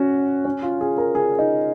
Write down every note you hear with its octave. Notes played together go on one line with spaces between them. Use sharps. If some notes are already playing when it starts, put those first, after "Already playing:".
Already playing: C#4 F#4
C#4
F4
G#4
A#4
G#4
D#4